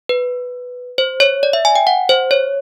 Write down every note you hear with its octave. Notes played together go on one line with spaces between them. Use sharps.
B4
C5
C#5
D5
E5
G#5
G5
F#5
C5
C#5